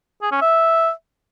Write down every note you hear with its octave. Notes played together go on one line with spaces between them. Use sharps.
G#4
C#4
E5